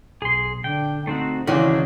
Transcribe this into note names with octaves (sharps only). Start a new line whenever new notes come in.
B1 G#4 C6
D3 D4 G5
A3 C4 D#4 F#4
G#1 C#3 E3 G#3 C#4 D4 F#4